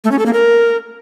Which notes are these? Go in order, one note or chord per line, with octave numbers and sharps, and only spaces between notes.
A3
C#4
A4
A#3
A#4